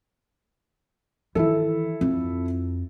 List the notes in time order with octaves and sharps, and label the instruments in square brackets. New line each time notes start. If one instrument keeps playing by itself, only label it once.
[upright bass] D#3 E3 [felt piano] E4 A4
[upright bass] F2